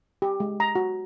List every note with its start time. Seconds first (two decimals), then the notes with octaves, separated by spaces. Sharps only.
0.22 G4
0.40 G#3
0.60 A#5
0.75 F#4